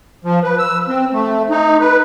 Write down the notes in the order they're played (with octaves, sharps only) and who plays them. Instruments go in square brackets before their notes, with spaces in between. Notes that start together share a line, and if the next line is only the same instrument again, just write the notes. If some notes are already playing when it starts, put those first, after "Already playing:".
[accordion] F3
B4
E6
C4
A3
D#4
B4